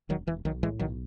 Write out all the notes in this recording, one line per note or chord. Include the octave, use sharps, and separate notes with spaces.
E1 D#3 F#3
E1 E3
B1 D#3 F#3
A2 E3 G#3
B1 D#3 F#3